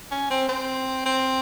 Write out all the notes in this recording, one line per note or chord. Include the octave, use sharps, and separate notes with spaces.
C#4
C4
C4
C4